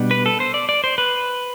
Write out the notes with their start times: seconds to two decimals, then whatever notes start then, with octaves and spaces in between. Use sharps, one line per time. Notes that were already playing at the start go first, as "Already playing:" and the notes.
Already playing: B2 G3 B3 D4
0.11 B4
0.26 A4
0.40 C5
0.54 D5
0.69 D5
0.84 C5
0.98 B4